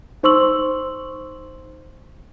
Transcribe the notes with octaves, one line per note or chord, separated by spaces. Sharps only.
D#4 C5 C6 C#6 E6 F#7